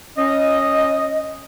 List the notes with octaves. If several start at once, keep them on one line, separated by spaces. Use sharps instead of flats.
C#4 D#5